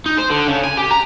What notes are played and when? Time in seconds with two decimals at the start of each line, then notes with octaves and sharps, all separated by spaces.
0.06 D#4
0.18 C5
0.30 D3
0.47 C#3
0.64 G#5
0.77 G4
0.91 A#5